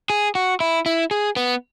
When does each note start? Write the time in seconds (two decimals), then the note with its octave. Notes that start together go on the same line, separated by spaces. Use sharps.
0.10 G#4
0.35 F#4
0.60 E4
0.86 E4
1.11 G#4
1.36 B3